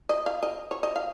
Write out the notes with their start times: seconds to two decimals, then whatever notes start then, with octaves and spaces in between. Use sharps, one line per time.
0.09 D#5
0.26 F5
0.43 D#5
0.71 C#5
0.83 D#5
0.96 F5